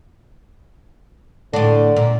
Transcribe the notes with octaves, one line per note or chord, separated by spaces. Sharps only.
A2 D3 D4
A#2